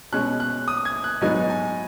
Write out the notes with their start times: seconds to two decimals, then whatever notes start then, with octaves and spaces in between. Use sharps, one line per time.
0.13 B2 G#3 C#4 F#6
0.40 F#6
0.68 D#6
0.85 G#6
1.04 F#6
1.21 G#2 F#3 B3 D#4 G#5
1.50 G#5